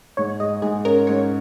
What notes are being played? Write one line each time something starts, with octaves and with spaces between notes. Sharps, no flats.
G#2 C#5
G#3 D#5
G#2 G#4
C#4 A#4
G#2 C#5